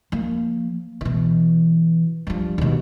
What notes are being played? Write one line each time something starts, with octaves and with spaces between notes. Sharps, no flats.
F3 A#3
B2 E3
G2 F3
D#2 B2